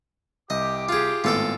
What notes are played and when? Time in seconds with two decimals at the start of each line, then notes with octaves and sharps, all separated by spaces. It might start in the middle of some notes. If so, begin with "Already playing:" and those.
0.50 C2 G4 D#5 D6
0.89 F4 G#4
1.24 G#1 A2 B3 F4 A4 G5